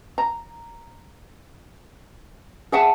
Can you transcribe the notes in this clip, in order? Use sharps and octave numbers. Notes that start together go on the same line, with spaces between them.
A#5
G#4 E5 F#5 A5